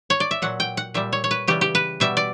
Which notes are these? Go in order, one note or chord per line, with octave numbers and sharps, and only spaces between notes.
C#5
D5
E5
A#2 F#3 F#5
G5
F#5
A#2 G3 E5
C#5
C#5
B4
C#3 E3 G3 G4
G4
B4
B2 G3 E5
D5